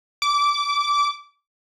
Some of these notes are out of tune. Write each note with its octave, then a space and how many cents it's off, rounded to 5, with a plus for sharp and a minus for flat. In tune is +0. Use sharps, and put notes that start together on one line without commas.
D6 -20